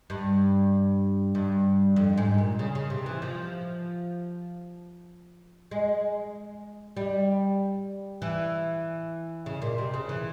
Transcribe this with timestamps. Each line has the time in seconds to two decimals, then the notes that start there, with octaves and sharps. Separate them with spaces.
0.10 G2
1.35 G2
1.96 F2
2.17 G#2
2.38 A#2
2.59 C#3
2.75 C#3
2.90 C3
3.06 E3
3.22 F3
5.71 G#3
6.97 G3
8.22 E3
9.46 C#3
9.62 A#2
9.78 C3
9.94 C#3
10.09 E3